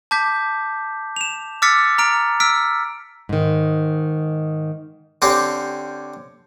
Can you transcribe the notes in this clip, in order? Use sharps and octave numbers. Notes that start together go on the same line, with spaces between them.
A5 D6 G6 B6
E7 F7
D6 E6 F6 A6 B6 C#7
A#5 F6 D7
E6 F6 B6 D7
G#2 D#3
D3 C4 C#4 G4